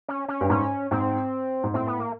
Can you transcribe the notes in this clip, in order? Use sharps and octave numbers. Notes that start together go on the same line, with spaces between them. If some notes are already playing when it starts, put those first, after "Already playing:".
C#4
C#4
G2
G#2 C#4
G#2 C4
G#2
A2 C4
B3
A#3